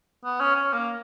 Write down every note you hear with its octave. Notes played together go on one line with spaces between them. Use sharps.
B3
C#4
C#4
A#3